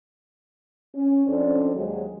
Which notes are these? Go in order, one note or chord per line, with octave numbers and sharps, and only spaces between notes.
C#4
F2 C#4 D4 A4 C5 D5
D#2 F#3 G#3